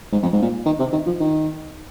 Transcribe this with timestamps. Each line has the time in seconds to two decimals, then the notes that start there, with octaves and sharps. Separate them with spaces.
0.12 G#2
0.22 F2
0.33 G#2
0.42 A#2
0.65 D#3
0.79 C3
0.92 D#3
1.06 F3
1.20 D#3